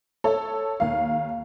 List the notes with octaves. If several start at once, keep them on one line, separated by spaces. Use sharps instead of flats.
A4 C#5
D#2 F5